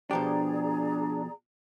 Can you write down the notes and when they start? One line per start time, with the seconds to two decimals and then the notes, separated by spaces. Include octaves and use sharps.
0.11 B2 F3 D4 G4 G#4 D5 A#5